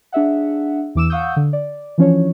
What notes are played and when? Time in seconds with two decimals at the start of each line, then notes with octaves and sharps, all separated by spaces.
0.12 D4 G#4 E5 F#5
0.95 E2 E3 D6 E6 E7
1.10 F5 F#5 C#6 D#6 E6 G6
1.36 D3
1.53 D5
1.98 E3 F3 C#4 D4 C#5